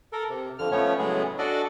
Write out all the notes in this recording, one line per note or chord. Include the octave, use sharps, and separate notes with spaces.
A4 A#4
C3
F2 D3 F6
F3 A3 B3 C#4 C#5
A2 C#3 F#3 G#3 B3 G#4
D4 F#4 A4 D5 D#5